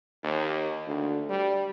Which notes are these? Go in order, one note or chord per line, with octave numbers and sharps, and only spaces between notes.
D#2
D2
G3